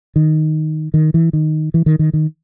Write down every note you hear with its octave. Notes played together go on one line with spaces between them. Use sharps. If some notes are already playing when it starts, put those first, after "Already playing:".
D#3
D#3
E3
D#3
E3
D#3
D#3
D#3